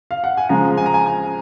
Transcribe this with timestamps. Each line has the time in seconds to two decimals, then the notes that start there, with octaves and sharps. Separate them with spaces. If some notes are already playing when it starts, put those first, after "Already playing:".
0.11 F5
0.24 F#5
0.37 G#5
0.49 C#3 F3 G#3 A#5
0.77 G#5
0.86 A#5
0.94 G#5
1.06 G#5